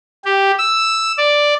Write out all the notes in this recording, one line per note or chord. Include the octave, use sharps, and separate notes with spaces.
G4
E6
D5